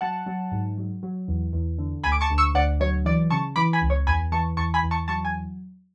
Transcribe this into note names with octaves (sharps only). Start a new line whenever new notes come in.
F#3 F#5 A5
F#3
G#2
F#3
F#3
E2
E2
D3
D2 G#5 B5
D6
A5 C#6
D2
C#6 E6
D2 D5 F#5
F#3 C#5
E3 D5
C#3 A5 C#6
E3 B5 D6
G#5 B5
C#2
C#5
E2 G#5 B5
E3 A5 C#6
E2 A5 C#6
G#5 B5
E2
A5 C#6
F#3 A5 C#6
G#5